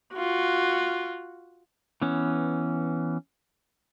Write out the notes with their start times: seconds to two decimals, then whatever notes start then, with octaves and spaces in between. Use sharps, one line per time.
0.14 F4 F#4
2.02 E3 B3 C#4